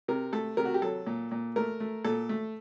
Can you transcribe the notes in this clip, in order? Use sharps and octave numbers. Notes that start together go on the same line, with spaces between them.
C3 A#4
A3 A4
C3 A#4
F#4
G4
F#3 A4
A#2
A#2
A3 A#4
A3
A#2 A4
A3